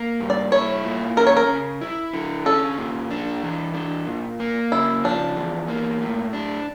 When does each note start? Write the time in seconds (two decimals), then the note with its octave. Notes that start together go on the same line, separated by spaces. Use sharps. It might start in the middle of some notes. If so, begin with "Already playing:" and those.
Already playing: A#3
0.20 G2
0.30 D5
0.52 E4 C#5
0.85 A#2
1.16 C#4 A#4
1.27 C#5
1.37 A#4
1.48 C#3
1.81 E4
2.13 D3
2.46 C#4 A4
2.78 A#2
3.11 D4
3.43 E3
3.74 D4
4.07 A#2
4.40 A#3
4.72 C#3 E4
5.04 F3 D4
5.36 E2
5.68 A#3
6.02 A2
6.33 D4